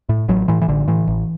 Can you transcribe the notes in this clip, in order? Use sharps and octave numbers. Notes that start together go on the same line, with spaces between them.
A2
A1 F#3
A2 E3
E3
A1 D3
A2 E3
A1